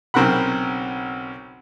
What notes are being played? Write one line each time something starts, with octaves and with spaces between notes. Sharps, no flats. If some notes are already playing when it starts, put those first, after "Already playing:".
B1 C#3 C4 A#4 F#5 B5